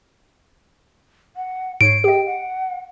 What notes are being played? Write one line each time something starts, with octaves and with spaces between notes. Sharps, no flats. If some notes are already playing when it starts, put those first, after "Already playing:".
F#5
G#2 C#5 C7 D7
G4 D#5 G5
F#5